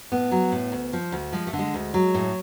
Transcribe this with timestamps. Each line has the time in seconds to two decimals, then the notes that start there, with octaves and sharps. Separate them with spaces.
0.12 A2 B3
0.32 F#3
0.52 A2
0.72 D2
0.93 F3
1.12 D2
1.33 F3 G#3
1.47 A3
1.53 D3
1.59 G#3
1.74 D2
1.94 F#3
2.14 A2